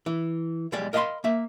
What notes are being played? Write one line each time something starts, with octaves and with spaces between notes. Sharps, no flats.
E3
B1 G3 G#3 D5
A#4 D#5 F5 F#5 B5 C6
A#3 E5